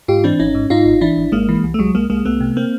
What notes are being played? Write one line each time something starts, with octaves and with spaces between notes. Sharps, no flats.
G#2 F4 G4
E3 C4 D4
G#1 C#4 D#4
G#2
G#2 D#4 F4
G#1
E3 D4 E4
G#1
G#1 G#3 A#3
E3
C2
A3
C2 F#3 G#3
C2 G#3 A#3
C2 G#3 A#3
C2 A3 B3
C3
A#3 C4